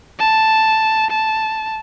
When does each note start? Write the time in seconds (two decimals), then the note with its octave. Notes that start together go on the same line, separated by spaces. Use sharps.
0.19 A5
1.11 A5